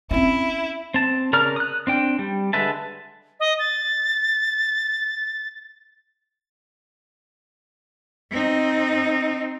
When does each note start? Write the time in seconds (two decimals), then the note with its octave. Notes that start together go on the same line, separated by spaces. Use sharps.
0.11 C4 C#4 E4
0.94 C4 A5
1.33 C#3 A#4 D5 A#5 F6
1.56 D#6 F#6
1.87 C4 D4 G5
2.19 G3
2.53 D3 G#3 B4 E5 A5
3.40 D#5
3.59 A6
8.31 C4 D#4